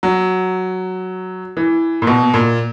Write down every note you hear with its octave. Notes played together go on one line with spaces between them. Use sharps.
F#3
E3
A#2
B2
A#2